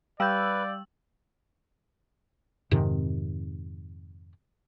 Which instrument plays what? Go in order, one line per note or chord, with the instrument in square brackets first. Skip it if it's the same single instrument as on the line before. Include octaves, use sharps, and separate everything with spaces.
[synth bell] G3 E6 F#7 [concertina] B4 [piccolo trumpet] D5 [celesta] F5 G6
[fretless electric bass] F2 G#2 C3 D#3